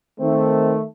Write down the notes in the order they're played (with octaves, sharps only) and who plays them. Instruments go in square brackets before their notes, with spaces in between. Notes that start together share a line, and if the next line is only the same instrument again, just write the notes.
[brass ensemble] D#3 A3 [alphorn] C4